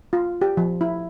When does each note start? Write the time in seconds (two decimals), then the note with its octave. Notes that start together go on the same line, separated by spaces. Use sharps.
0.13 F4
0.42 G4
0.57 F3
0.81 E4